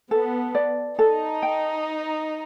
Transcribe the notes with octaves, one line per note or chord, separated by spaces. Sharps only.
B3 A4
D5
D#4 A4
G5